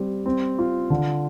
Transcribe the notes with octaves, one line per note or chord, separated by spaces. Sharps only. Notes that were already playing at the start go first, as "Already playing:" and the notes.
Already playing: G3 C4
C4
F4
D3